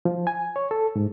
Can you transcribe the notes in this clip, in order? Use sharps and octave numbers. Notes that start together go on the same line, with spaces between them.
F3
G#5
C#5
A4
G#2